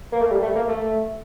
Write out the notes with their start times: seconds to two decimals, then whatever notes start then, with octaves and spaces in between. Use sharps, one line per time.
0.12 A#3
0.21 A3
0.31 G3
0.42 A3
0.55 A#3
0.68 A3